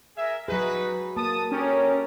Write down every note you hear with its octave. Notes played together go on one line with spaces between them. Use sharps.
G#4 A#4 E5
F#3 D#4 F#4 G#4 B4
A#3 A5 D#6
C#4 G4 A4 A#4